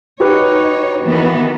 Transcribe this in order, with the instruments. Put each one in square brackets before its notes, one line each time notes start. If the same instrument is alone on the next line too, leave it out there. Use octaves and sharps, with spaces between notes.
[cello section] D#4 C#5 [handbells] F#4 G4 B4
[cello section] D#3 E3 B3